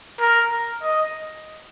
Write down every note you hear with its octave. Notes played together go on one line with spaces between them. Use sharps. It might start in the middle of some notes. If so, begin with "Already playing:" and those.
A#4
D#5